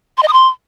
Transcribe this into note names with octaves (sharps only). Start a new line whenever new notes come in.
C6
D#5
D#6
C6